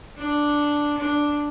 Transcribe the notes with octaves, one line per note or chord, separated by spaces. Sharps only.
D4
D4